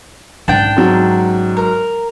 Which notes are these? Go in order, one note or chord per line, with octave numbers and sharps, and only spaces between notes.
G#1 C#4 D4 G5
G#2 F#3
A#4